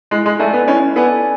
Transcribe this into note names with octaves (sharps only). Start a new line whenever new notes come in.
G#3 E4
G#3
A3 A4 D5 G#5
B3
C#4 E4
B3 A4 D5 G#5